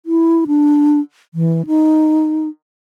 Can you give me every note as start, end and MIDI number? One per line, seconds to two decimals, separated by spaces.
0.06 0.45 64
0.47 1.00 62
1.34 1.62 52
1.67 2.48 63